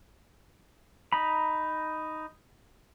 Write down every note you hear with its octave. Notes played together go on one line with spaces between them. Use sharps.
D#4 A#5 B5